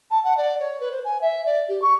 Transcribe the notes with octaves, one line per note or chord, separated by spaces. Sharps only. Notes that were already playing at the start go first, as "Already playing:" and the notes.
A5
F#5
D5
C#5
B4
C5
G#5
E5
D5
G4
C#6